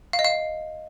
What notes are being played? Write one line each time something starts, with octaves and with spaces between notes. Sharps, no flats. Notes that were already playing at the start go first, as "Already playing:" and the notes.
F5
D#5
F5